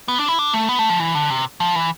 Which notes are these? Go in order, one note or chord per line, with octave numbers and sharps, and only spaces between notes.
B3
D4
E4
D4
A3
B3
A3
F3
E3
D3
C3
F3
E3